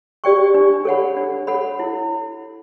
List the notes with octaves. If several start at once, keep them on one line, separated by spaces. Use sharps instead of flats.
G4 D5 G5 C#6
D4
A4 C#5 F#5 B5
D4
A4 C#5 F#5 B5
E4